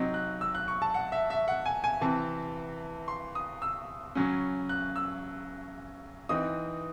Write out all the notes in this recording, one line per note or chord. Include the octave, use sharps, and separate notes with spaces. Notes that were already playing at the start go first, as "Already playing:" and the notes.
Already playing: C3 F#3 C4 D#4
F#6
E6
F#6
C#6
A5
F#5
E5
E5
F#5
G#5
G#5
C3 E3 C4 A5
C6
D#6
E6
C#3 F#3 C#4
F#6
E6
E3 C4 D#4 D#6